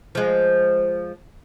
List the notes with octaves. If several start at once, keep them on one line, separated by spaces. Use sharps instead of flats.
F3 G#3